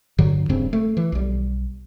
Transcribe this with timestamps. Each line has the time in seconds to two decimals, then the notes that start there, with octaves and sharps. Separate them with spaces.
0.18 G2 D3 F#3
0.49 D#1 G2 C#3 C4
0.73 A3
0.97 E3
1.12 B1 G3